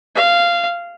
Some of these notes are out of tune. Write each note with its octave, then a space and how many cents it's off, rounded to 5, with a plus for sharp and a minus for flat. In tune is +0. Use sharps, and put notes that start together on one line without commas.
F5 -15